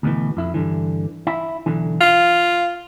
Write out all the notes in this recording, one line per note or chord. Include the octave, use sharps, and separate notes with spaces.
D2 B2 E3
F2 E4
G2 D3 E3
E4 E5
B1 D3 E3
F4 F5